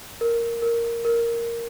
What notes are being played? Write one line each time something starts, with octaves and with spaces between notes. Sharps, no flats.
A#4
A#4
A#4